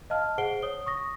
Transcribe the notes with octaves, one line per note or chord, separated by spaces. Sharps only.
D#5 F5 A5 F6
G#4 C5 F#5 C7 D7 G7
C#5 D#6 G7
C#6 D#6 A#6